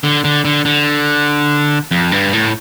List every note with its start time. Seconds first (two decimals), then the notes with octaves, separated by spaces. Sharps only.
0.04 D3
0.24 D3
0.45 D3
0.65 D3
1.91 F2
2.12 G2
2.33 A2